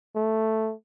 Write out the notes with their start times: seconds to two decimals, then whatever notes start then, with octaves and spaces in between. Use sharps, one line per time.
0.16 A3